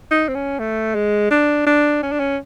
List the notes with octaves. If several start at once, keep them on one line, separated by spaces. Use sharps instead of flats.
D#4
C4
C#4
A3
G#3
D4
D4
C#4
D4
C#4